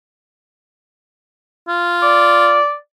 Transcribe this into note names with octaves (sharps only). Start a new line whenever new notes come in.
F4
D5